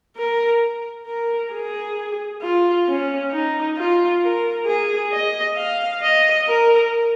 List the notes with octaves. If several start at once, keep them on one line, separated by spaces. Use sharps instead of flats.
A#4
A#4
G#4
F4
C#4
D#4
F4
A#4
G#4
D#5
F5
D#5
A#4